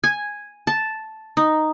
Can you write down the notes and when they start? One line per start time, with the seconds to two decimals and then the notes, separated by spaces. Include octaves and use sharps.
0.04 G#5
0.67 A5
1.37 D#4